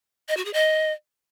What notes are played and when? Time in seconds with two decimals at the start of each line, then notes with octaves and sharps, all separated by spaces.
0.29 D#5
0.37 F#4
0.45 G#4
0.54 D#5